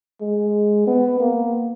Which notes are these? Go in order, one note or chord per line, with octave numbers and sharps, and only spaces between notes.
G#3
B3
A#3